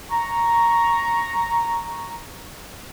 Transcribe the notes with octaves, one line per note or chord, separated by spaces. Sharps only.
A#5 C#6